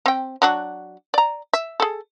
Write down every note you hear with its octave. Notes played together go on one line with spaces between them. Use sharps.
C4 G5
F#3 D4 F#4
D5 A#5
E5
G#4 A4